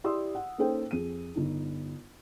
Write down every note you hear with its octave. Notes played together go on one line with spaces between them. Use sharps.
E4 G4 D5 C6 D#6 E6
F#5
A#3 C#4 D#4 A4 C5 G5
F2 G#4 D#7
G1 D#4